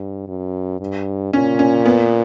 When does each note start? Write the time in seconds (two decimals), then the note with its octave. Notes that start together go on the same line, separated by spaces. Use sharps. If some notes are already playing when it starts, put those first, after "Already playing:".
Already playing: G2
0.27 F#2
0.80 G2
1.33 A#2 C#4
1.59 C#4
1.86 B3